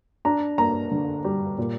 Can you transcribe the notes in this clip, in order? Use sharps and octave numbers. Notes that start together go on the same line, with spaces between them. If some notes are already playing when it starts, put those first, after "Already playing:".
D4 A#5
A#3 A#5
D3
G3
A#2